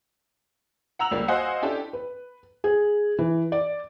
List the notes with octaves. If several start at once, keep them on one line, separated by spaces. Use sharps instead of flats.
F#5 A#5 E6 F7 F#7
C#2 G3 A#3
F#4 C5 D#5 F5 F#5 G#5
C#4 D4 E4 G4 A4
B4
G#4
E3
D5